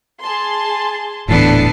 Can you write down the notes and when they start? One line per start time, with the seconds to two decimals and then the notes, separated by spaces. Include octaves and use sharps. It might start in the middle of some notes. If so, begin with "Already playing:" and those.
0.20 G#4 A5 C6
1.28 D#1 A2 D3 E3 B3 A5 C7